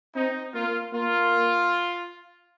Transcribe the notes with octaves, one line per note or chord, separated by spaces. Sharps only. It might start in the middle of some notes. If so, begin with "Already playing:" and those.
C4 D#4
A#3 F4
A#3 F4